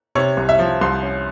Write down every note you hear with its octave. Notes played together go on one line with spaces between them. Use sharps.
C3 C#5
C2
E5
F3
C2 C6
C#4